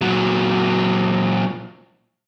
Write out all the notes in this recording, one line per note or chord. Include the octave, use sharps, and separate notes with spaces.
A#2 F#3